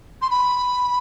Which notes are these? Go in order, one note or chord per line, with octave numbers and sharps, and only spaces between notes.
C6
B5